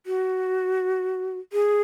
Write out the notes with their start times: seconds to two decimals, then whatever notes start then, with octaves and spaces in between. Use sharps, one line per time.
0.06 F#4
1.53 G#4